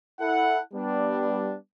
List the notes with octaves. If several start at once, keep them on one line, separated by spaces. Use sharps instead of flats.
E4 A4 F#5
G3 B3 D4